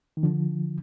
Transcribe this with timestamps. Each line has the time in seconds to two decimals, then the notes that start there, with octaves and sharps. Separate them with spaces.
0.17 D#3
0.23 D3 F3